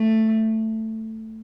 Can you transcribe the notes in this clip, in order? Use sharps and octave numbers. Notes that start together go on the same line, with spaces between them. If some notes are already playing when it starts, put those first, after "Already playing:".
Already playing: A3